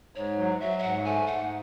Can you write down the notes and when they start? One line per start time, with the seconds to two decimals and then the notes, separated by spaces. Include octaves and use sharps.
0.16 G#2 C#5
0.38 F#3
0.60 F#3 E5
0.79 E5
0.83 G#2 F#5
1.05 A3 G#5
1.27 G#2 F#5